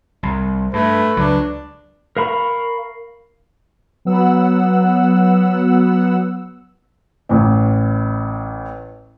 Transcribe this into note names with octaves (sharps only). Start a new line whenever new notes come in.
C2
G2 A3 B4
C#2 F#3 D4
A#4 F5 B5 C#6
F#3 B3 F#5 E6
A1 A2